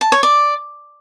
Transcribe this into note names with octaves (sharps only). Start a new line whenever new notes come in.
A5
C#5
D5